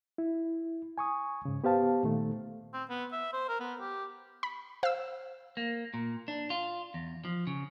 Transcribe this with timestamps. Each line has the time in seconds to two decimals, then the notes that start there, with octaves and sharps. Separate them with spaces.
0.18 E4
0.98 G#5 C#6 D#6
1.45 G#2 C#3
1.64 B3 G4 C5 F5 A5
2.03 A#2 D#3 A3
2.73 C4
2.89 B3
3.12 E5
3.33 C5
3.48 A#4
3.60 B3
3.80 G4
4.43 B5
4.83 C5 F5 E6
5.57 A#3
5.94 A#2
6.28 D4
6.50 F4
6.94 E2
7.25 F3
7.47 C#3